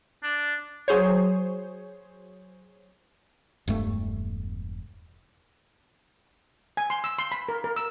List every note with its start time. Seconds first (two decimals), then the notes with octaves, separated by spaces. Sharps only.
0.23 D4
0.88 F#3 G#4 C5 C#5
3.68 E1 G2 A3
6.77 G#5
6.90 C6
7.04 E6
7.19 C6
7.32 B5
7.49 A#4
7.64 A#4
7.76 E6